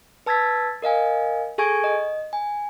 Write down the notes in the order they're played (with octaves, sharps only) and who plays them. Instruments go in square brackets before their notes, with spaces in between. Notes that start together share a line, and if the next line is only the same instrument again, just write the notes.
[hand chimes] B4 A5 E6 G#6 A6 B6
A#4 D#5 F5 G#5
G#4 A4 G#5 C#6 G#6 D7
D#5
G#5